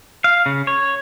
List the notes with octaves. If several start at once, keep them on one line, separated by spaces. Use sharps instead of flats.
F5
C#3
C#5